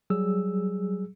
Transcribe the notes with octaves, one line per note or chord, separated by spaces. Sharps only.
F#3 G3 G#4 E6